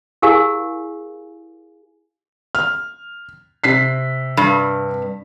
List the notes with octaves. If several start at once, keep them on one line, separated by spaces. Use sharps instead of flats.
E4 G4 G#4 A#4 F5 G#5
F6
C3 B6 C7
G2